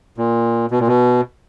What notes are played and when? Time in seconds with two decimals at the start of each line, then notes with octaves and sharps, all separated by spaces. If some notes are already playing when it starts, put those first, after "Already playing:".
0.18 A#2
0.71 B2
0.80 A#2
0.87 B2